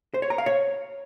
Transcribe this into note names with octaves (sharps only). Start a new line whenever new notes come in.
C5
C#5
A#5
F5
C#5